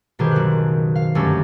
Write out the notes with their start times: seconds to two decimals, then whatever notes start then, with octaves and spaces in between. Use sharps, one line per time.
0.19 G1 B2 D#3 G4 G#4 C5
0.32 F#1 F#6
0.96 F5
1.15 G1 F#2 A3 C#4 G4 E6